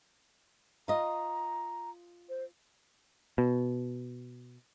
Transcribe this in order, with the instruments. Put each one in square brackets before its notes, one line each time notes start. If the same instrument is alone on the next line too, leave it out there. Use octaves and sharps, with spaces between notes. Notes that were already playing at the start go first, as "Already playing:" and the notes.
[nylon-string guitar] F4 D#5 [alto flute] A#5
[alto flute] C5
[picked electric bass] B2